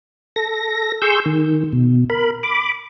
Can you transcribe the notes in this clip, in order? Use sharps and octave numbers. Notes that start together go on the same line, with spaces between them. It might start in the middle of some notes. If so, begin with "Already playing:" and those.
A4 A#6
G#4 C6 C#6 E6 G6
D#3
B2
A#4 B5
B5 D6